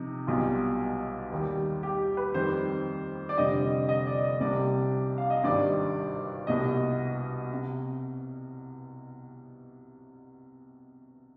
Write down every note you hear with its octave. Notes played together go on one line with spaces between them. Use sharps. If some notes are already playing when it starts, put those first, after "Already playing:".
Already playing: C3 F3 D#4
B1 B2 G3 F4
D#2 D#3 G3
G4
B4
F2 D#3 G3 C5
D5
F1 F2 D3 G3 D#5
D#5
D5
D#5
C2 C3 G3 D5
F5
D#5
G#1 G2 D#3 G3 D5
C2 B2 G3 D#5
C3